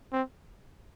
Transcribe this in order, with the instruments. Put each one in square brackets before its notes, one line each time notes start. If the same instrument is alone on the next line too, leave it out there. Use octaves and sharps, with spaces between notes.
[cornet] C4